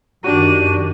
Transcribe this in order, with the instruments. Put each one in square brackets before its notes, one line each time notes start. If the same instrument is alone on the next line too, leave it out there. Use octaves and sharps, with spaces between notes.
[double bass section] F#2 D#3 [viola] D4 [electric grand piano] F#4 G4 [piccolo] D#7